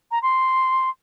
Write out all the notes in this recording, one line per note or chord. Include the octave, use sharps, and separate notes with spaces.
A#5
C6